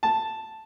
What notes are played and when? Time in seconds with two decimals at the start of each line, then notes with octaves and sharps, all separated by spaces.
0.03 A5